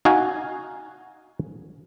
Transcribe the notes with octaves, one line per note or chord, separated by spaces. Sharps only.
D#4 F#4 F5 G#5